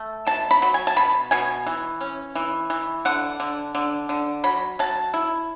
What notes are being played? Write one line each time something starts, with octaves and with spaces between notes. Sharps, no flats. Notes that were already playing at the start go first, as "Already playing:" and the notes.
Already playing: A3
B2 A5
B5
F#3
G#5
A5
B2 B5
B2 G#5
E3
C#4
E3
E3
D3 F#5
D3
D3
D3
F#3 B5
F#3 A5
E4